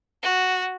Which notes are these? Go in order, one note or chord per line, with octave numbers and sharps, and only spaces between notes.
F#4